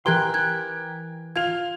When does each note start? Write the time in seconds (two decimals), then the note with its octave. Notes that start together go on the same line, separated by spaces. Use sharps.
0.06 E3 G4 A#4 C6 F#6 G#6 G7
0.34 F#6 G#6
1.36 F4 F5 G#6 F7